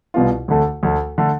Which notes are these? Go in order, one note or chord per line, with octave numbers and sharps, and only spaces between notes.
C2 B2 B3 F4
D2 D3 A3
D2 D3 A3
D3 A3